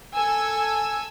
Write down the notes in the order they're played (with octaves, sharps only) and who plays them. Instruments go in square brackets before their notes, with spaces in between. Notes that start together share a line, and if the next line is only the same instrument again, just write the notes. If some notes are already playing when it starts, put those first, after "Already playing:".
[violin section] A4 G#5 E6